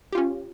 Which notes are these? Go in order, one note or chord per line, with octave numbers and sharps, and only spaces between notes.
C#4 F4 G4